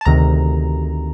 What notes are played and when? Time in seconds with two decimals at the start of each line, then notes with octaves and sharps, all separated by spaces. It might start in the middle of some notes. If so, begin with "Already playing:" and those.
0.01 A5
0.05 D2 C3 D#3 A#5